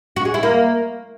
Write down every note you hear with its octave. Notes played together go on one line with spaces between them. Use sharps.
F#4
G#4
E4
A#3